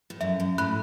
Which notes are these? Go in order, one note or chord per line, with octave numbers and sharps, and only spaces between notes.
A2
F#2 E5
F#2
A2 B5 F#6